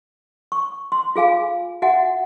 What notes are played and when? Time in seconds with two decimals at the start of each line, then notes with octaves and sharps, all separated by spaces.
0.52 C#6
0.92 C6
1.16 F4 G#4 F5 G#5
1.82 F#4 E5 F#5 G#5